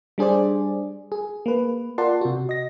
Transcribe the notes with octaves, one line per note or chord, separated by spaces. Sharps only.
G3 D4 G#4 C5 D5
G#4
A#3 B4
F4 A#4 D5 F#5 A5 C6
C3 F#4
D#5 A#6